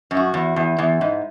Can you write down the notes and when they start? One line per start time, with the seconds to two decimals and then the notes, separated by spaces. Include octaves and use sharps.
0.11 F#2
0.17 F#4
0.34 E2
0.56 E2
0.78 E2
1.01 G#2